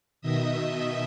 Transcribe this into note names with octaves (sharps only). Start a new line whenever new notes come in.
B2 D#3 D#5 E5 D#6